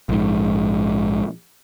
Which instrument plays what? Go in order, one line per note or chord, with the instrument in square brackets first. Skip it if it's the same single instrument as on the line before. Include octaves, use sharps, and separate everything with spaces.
[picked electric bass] A#1 G#2